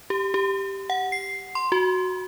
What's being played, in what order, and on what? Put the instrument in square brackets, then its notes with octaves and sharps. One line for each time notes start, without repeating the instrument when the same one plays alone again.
[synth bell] G4
G4
F#5
C7
C6
F#4